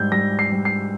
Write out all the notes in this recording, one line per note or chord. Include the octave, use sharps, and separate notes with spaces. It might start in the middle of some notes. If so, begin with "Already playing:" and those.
Already playing: G#2 G3 G6
G3 A#6
C7
G3
C7